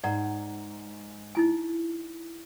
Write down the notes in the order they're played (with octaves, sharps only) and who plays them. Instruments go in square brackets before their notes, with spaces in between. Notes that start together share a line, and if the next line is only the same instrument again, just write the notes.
[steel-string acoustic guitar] G#2 [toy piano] D5 F#5 A#5
[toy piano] D#4 E4 G#5